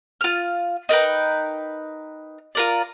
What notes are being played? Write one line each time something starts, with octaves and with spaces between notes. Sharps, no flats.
F4 F6
D#4 A#4 B4 G5
F4 A#4 D5